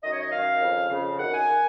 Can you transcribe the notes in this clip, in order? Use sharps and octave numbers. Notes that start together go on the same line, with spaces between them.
F#2 D#3 D#5
C#5
D#5
F#2 D#3 F5
F2 C#3
F2 C#3
F#2 D#3 F#5
G#5
D#3